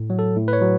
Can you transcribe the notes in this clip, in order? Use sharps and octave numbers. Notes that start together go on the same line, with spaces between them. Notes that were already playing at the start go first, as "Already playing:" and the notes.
Already playing: A2
F#3
A4
A2
B4
C#5
F#3